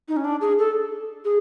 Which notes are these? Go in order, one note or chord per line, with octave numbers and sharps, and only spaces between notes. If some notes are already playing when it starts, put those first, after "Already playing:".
D#4
C#4
D4
G#4
A4
G#4